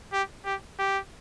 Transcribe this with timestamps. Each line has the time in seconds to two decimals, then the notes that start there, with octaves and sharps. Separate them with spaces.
0.13 G4
0.45 G4
0.79 G4